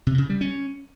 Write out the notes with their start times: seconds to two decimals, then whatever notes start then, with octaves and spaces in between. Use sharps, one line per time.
0.07 C3
0.18 C#3
0.29 G3
0.41 C#4